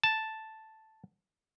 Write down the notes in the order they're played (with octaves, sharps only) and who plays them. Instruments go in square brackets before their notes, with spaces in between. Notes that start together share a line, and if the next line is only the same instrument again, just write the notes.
[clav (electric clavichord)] A5